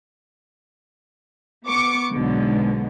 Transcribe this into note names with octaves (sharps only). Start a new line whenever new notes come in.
B3 C#6 D6 C#7
B1 G#2 B2 D3